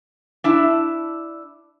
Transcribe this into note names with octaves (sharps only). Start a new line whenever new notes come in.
D4 E4 A5